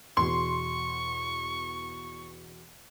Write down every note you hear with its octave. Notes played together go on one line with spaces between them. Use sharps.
E2 B2 C6 C#6